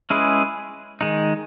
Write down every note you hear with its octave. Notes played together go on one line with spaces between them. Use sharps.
G#3 C#4 E4 G#4 B4
D#3 G#3 D#4